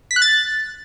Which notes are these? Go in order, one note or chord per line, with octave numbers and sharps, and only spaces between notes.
B6
F#6
A6